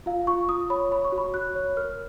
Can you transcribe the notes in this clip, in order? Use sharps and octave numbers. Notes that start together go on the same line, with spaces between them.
F4 F5
F4 C#6
F4 D#6
C#5 B5
C#5 B5
C#6
F#4
B5
F#4 F#6
C#5
A#4 F6